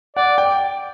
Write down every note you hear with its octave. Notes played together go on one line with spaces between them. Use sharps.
D5 F#5
G5